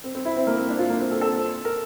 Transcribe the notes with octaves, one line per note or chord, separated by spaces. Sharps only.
C4
C4
E4
C4
A#3
C4
D4
F4
A#3
C4
A4
A4
A#4